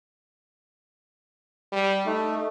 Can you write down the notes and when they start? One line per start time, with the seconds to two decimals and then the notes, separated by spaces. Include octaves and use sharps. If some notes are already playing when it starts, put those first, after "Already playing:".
1.72 G3
2.06 A3 D#4